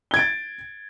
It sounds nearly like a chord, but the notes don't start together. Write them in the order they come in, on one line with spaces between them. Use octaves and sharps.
G7 G#6 D7 A6